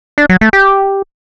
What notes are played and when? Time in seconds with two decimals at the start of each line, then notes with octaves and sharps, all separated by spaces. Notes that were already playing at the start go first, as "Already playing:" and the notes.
0.18 D4
0.29 F#3
0.41 A3
0.53 G4